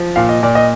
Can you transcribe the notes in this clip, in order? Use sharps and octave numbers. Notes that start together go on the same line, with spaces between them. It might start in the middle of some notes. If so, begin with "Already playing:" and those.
Already playing: F3
A#2 F5
D#5
A#2 D5
D#5